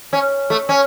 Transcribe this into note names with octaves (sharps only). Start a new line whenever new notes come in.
C#4
A3
C#4